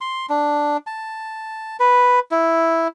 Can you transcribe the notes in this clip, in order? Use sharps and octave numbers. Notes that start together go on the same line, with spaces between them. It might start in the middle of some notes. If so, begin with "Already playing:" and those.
C6
D4
A5
B4
E4